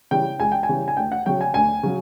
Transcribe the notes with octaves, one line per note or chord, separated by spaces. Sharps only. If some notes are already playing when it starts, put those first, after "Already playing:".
C#3 E3 G3 G5
C#2 G#5
G5
G#5
C#3 E3 G3
G#5
D2 G5
F#5
C#3 F#3 G5
G#5
D2 G#5
C#3 F#3